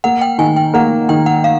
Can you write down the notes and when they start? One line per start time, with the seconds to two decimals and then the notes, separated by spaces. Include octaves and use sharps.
0.04 A#3 F#5
0.21 G5
0.38 D#3 G#5
0.56 G5
0.74 A#3 F#5
1.09 D#3 G5
1.26 F#5
1.44 F5